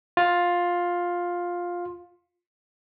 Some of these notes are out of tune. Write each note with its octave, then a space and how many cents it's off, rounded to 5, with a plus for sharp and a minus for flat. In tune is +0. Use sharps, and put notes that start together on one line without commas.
F4 +10